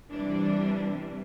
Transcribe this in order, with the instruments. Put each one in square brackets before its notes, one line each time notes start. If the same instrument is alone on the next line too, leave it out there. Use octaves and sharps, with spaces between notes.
[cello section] C3 E3 G3 [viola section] D4